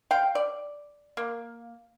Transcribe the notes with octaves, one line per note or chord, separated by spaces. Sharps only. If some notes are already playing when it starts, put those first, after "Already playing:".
F5 G5
D5
A#3